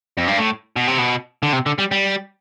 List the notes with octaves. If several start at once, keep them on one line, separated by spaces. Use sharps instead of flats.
F2
G2
A2
B2
C3
B2
D3
C3
D3
G3
G3